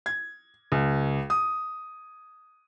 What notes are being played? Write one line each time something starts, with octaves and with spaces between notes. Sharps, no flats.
G#6
C#2
D#6